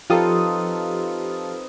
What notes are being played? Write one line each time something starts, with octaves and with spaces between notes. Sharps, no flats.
F3 C4 D#4 F4 G4 A4 B4 D#6